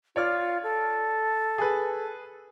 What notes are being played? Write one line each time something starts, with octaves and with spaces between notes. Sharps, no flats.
F4 C#5 D5 F6
A4
G#4 B4